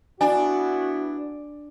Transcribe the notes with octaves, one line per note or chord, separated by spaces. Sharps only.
B3 D4 E4 F#4 G#5